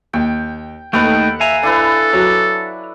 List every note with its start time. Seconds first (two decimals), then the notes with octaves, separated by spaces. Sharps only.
0.13 D#2 G5
0.93 D#2 A3 D#4 A4 B4 F#5 G5
1.40 E5 F5 G#5 A#5
1.63 D4 E4 A4 B4
2.13 F#3